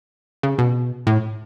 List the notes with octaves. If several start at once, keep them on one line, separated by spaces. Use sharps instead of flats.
C#3
B2
A2